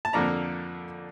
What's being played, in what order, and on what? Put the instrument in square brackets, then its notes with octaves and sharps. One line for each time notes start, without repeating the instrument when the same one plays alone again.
[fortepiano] A5
F2 D3 F3 A#3 D4 A#5